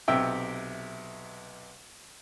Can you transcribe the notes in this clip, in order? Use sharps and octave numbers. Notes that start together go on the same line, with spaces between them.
B1 C3 E5 G5 E6